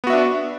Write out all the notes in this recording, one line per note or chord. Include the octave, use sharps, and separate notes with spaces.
B3 D4 F#4 E5